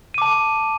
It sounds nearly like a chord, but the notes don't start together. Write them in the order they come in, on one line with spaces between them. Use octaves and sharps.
D#7 D6 A5